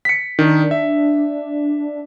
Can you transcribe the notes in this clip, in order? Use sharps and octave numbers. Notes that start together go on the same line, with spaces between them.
B6 C#7
D#3 D4
E5